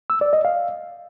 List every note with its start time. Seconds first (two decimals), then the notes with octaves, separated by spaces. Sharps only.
0.10 E6
0.21 D5
0.33 D#5
0.45 F5